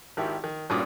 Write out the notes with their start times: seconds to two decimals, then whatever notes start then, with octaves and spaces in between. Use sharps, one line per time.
0.17 G#1 D#3 E4 G4
0.44 D#3
0.70 G#1 G2 A#2 C#4 D6 D#6